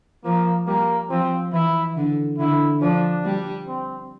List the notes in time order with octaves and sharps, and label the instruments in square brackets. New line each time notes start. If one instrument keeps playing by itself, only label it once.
[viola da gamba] F3 [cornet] A#3
[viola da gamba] G3 [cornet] A#3
[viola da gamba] F3 [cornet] C4
[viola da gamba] E3 [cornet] E4
[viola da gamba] D3
[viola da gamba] D3 [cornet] E4
[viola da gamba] F3 [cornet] D4
[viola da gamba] G3
[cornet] C4